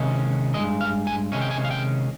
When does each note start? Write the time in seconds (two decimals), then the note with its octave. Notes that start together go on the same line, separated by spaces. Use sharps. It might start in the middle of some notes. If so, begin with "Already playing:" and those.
Already playing: C3 D#3 G#3 C#4
0.54 D#3 G#3 D#5
0.59 G2
0.81 F5
1.07 G#5
1.32 C3 D#3 G#3 C#4 G#5
1.41 G5
1.51 G#5
1.65 F5
1.71 G5